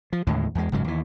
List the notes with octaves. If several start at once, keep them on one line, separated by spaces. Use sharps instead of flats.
F3
D#2 A2 D3 G#3
E2 G#3
F#1 G#2 C#3 F#3
D#2 E3